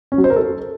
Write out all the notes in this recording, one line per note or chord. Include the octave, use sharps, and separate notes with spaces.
C#4
F#3
C5
A#4
A4